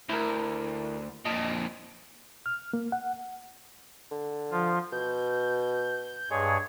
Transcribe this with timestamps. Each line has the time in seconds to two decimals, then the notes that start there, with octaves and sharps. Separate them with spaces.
0.09 D2 E4 A#4
1.25 F2 A#2 D#5 A5
2.46 F6
2.73 A#3
2.92 F#5
4.11 D3
4.51 F3 F4
4.92 B2 G6
6.30 G2 G#3 G#4 C#5